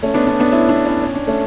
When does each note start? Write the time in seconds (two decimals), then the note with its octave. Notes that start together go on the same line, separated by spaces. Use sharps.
0.03 A3 C#4
0.14 B3 D4
0.27 B3 D4
0.40 B3 D4
0.51 C#4 E4
0.69 B3 D4
0.85 C#4 E4
1.02 C#4
1.15 D4
1.27 A3 C#4